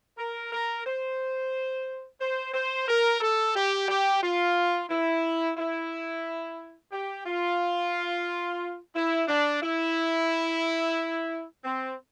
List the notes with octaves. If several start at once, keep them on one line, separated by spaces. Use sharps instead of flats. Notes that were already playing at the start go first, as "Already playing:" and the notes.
A#4
A#4
C5
C5
C5
A#4
A4
G4
G4
F4
E4
E4
G4
F4
E4
D4
E4
C4